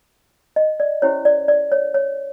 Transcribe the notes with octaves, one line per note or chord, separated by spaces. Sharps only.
D#5
D5
C#4 E4 G4 C5 C#5
D5
D5
C#5
C#5